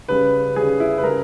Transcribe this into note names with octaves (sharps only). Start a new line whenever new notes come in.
C#3 G3 B4
C#3 G3 G#4
E4
B4
C#3 G3 A#4